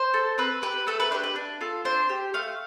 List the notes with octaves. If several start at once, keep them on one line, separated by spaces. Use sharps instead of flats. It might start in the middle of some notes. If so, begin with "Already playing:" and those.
Already playing: C5
A4
C4 B4
G4 B4
A3 A4
B4
D4 G4 B4
B4
D4
F4 A4
D4 C5
G4
A3 F5